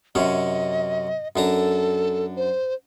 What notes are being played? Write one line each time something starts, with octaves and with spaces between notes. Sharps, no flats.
F#2 C3 C#4 D#5
F#2 D4 A4 A#5
C5